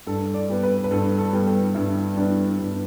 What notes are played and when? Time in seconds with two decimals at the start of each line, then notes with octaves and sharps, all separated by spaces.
0.07 G2 A4
0.34 D5
0.49 G3 B3
0.63 B4
0.84 B4
0.91 G2 A4
1.18 A4
1.33 G3 B3
1.47 G4
1.75 G2 E4
2.17 G3 B3 D4
2.58 G2 B3